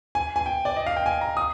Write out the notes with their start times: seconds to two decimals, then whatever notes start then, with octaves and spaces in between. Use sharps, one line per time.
0.15 G#5
0.36 G#5
0.46 G5
0.65 D5
0.76 D#5
0.86 F5
0.96 G5
1.06 G#5
1.21 A#5
1.37 D#6